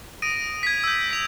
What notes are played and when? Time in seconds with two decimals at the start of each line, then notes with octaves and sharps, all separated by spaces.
0.22 D#6 A#6 D7 D#7
0.63 G#6 B6
0.84 E6 G6
1.09 A#6 B6 F7